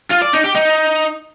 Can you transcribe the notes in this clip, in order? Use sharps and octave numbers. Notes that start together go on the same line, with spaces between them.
F4
D5
D#4
G4
D#4